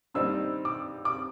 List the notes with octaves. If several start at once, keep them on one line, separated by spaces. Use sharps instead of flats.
G2 D#3 G3 C4 D#4 E6
D6
D6